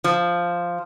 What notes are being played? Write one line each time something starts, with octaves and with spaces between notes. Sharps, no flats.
F3